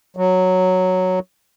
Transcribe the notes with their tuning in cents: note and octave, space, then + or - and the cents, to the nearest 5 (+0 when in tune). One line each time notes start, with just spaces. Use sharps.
F#3 -5